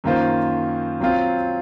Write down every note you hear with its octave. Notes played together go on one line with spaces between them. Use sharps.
F#2 D#3 A#3 F4 C5
F#3 C4 F4 C5